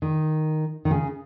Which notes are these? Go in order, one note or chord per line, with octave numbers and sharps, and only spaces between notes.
D#3
D#3
C#3